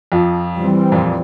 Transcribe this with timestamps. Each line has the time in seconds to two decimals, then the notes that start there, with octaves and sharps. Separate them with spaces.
0.12 F2 F3
0.55 E3 G3 C4
0.92 F2 A#2